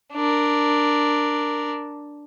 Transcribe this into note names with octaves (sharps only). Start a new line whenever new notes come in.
D4 A#4